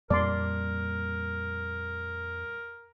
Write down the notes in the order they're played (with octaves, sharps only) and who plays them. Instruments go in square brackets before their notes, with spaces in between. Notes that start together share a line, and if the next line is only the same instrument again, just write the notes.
[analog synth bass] F2 [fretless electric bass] A#2 G3 A#3 [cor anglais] A#4 [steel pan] D5 C6